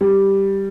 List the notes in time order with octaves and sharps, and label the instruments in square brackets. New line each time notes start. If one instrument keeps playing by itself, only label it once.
[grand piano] G3